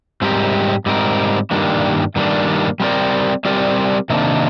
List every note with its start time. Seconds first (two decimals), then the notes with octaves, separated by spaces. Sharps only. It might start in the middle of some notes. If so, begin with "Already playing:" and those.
0.22 G#2 G3 C4 G4 A#4
0.86 G#2 G3 C4 G4 A#4
1.51 G2 D#3 G3 A#3 D4
2.16 G2 D#3 G3 A#3 D4
2.80 G3 C4 G4 A#4 D5
3.45 G3 C4 G4 A#4 D5
4.10 C3 D#3 A#3 D4